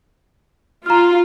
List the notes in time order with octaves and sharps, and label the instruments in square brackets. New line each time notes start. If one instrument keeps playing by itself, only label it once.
[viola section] F4 [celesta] A#5 F6